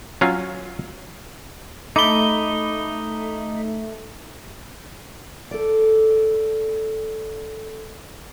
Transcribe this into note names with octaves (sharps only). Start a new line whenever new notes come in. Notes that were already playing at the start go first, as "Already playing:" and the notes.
F#3 C#4 F4
A3 D#4 B5 D6 G7
A4 D5